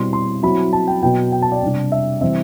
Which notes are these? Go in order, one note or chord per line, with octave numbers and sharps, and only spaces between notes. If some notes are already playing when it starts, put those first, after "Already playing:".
Already playing: B2 G3 C4 E4 C6
C6
F#3 C4 E4 B5
A5
G5
B2 F#3 B3 G5
G5
A5
D5
C3 G3 D4
E5
E3 G3 C4 E5